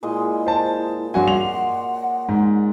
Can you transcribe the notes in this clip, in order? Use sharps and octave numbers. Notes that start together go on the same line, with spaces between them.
A#2 G#3 E4 D#5
C5 A5
G2 F#4 C#5 D5 F#5 G#5 C6
F7
G#2